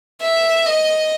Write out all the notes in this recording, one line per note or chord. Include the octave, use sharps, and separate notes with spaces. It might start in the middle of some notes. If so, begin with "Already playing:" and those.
E5
D#5